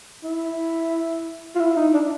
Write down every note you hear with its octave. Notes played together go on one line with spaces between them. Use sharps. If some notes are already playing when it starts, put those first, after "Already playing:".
E4
F4
E4
D#4
D4